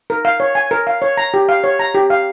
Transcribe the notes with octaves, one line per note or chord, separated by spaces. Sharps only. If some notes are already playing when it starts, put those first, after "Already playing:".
A#4
F5
C#5
G#5
A#4
F5
C#5
A#5
G4
F5
C#5
A#5
G4
F5